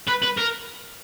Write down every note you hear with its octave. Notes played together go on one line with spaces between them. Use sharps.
B4
B4
A#4